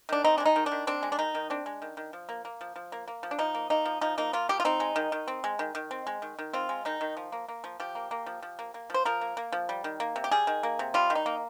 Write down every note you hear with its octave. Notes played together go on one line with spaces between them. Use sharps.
D#3 D4
C4 D#4
G#3 D4
D#4
D#3
D4
D#3
C4 D4
G#3
D4
D#3 D#4
D#3
C4 D4
G#3
D#3
D#3
F3
A#3
A#3
F3
F3
A#3
A#3
F3
D4
F3 D#4
A#3
A#3 D#4
F3
F3 D#4
A#3 D#4
A#3 F4
F3 G4
F4
C4 D#4
G#3
D#3
D#3
C4
G#3
D#3
D#3
C4
G#3
D#3
D#3
C4 F4
G#3
D#3 D#4
D#3
F3
A#3
A#3
F3
F3 G4
A#3
A#3
F3
F3
A#3
A#3
F3 C5
F3 A#4
A#3
A#3
F3
G3
D#3
A#3
C3
G4
G3 G#4
D#3
A#3
C3
G3 F4
D#3
D#4
A#3